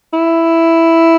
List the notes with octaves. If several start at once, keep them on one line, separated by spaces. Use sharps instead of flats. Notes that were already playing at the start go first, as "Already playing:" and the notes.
E4